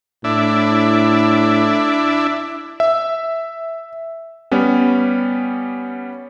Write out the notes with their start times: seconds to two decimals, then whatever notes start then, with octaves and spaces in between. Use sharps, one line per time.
0.24 A2 D4 E4
2.80 E5
4.51 G3 B3 C#4